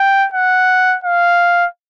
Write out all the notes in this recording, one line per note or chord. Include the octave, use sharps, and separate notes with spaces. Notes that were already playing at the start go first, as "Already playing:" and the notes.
Already playing: G5
F#5
F5